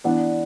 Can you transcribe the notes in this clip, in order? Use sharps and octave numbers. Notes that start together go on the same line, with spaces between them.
E3 B3 D4 D5